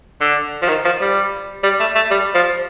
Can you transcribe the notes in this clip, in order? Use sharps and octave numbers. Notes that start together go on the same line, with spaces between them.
D3
F3
D#3
F3
G3
G3
A3
A3
G3
F3